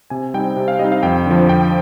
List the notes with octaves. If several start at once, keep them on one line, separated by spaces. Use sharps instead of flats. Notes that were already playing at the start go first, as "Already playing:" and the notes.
C3 G#5
G3 C4 D#4 G5
C3
F5
G3 C4 D#4 D#5
F5
F2 G5
D3 F3
F2 G5